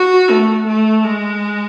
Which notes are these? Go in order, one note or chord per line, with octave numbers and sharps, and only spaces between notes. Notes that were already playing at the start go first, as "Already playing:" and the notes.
Already playing: F#4
A3
A3
G#3